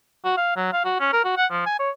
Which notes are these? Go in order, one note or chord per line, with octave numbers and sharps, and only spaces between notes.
F#4
F5
F#3
F5
F#4
C#4
A#4
F#4
F#5
F3
G#5
C#5